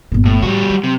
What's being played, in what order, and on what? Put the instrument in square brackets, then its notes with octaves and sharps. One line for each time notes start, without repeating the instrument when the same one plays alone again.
[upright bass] G1 A#2
[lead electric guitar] A2
[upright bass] A2 [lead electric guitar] G3 F#4
[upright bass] F#3
[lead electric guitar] C3